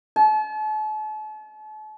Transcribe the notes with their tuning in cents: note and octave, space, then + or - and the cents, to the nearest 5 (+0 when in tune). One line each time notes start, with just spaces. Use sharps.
A5 -40